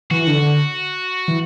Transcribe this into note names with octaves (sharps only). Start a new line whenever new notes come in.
E3 F#4
D3
D3
E3